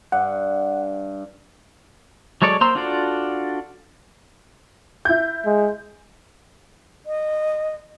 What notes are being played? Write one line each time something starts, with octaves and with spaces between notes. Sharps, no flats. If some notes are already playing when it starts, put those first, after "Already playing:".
G2 F#5
F#3 G#3 A4 C#5 D5
A#3 C5 A#5 C6 E6
D4 F4 F#4 A4 D5
E4 G6
G#3
D#5